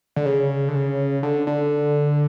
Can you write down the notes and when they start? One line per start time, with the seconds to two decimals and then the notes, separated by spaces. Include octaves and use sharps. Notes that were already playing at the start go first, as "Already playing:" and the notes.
0.16 D3
0.26 C#3
0.68 D3
0.75 C#3
1.23 D3
1.47 D3